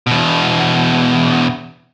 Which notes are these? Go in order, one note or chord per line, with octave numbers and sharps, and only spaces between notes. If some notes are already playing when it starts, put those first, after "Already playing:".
E2 B2